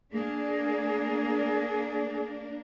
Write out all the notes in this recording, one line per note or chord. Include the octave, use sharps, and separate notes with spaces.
A#3 D4 G#4